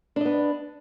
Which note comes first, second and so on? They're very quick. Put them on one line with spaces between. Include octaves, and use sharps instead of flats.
D4 D#5 B3